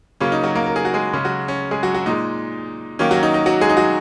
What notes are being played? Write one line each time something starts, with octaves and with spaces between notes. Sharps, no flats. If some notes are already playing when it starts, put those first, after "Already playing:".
C#3 F#3 A#3 C#4
D#4
F#3 F#4
A#3 A#4
A#4
G#4
F#4
G#3 G#4
C#3 G#3 C#4
F#3 F#4
C#4
G#3 G#4
F#3 F#4
F#3 F#4
A#2 G#3 D#4
D#3 F#3 A#3 C#4
F#3 F#4
D#4
D#4
F#3 F#4
G#3 G#4
D#4
F#3 F#4